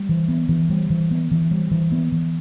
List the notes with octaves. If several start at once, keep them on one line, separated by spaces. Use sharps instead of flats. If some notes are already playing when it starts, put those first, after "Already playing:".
Already playing: G3
E3
B3
E3
G3
E3
B3
E3
G3
E3
B3
E3